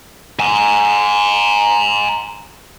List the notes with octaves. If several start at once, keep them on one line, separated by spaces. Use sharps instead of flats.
G#5 A#5